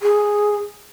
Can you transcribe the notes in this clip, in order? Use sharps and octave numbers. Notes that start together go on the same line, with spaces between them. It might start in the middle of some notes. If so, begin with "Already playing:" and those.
G#4